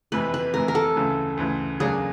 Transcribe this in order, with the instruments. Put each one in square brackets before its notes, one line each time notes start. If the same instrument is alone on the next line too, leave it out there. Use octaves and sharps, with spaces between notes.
[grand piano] F2 C3 E3 [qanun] B4
[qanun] B4
[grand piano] F2 C3 E3 [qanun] A#4
[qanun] A#4
A4
[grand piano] D2 C#3 E3
D2 C#3 E3
[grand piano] E2 C#3 F#3 A#3 D4 [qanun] G#4